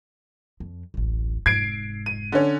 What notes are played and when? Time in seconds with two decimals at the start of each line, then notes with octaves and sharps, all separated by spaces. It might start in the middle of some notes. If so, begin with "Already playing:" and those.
0.60 F2
0.94 D1 A1
1.46 F1 G#2 G#6 C7 D7
2.06 D#7
2.32 D3 C#4